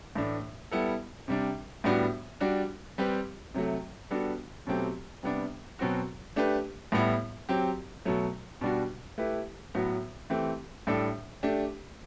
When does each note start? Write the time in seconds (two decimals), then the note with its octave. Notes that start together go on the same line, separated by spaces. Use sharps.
0.15 A2 E3 A3 D4
0.71 G3 B3 E4 A4
1.28 C3 G3 D4
1.84 A2 G3 B3 D4 F#4
2.40 G3 D4 F#4
2.98 G3 C4 G4 B4
3.54 C3 F#3 A3
4.10 G3 B3 D4 F#4 A4
4.67 B2 F#3 A3 C4 G4
5.23 C3 G3 B3 D4
5.79 B2 F#3 C4 F#4
6.36 A3 D4 G4 B4
6.92 A2 G3 B3 E4
7.49 F#3 C4 G4
8.05 B2 F#3 A3
8.61 B2 G3 D4 F#4
9.18 A3 E4 G4 B4
9.74 A2 F#3 B3 F#4 B4
10.30 E3 A3 C4 G4
10.87 A2 G3 D4 A4
11.43 A3 D4 G4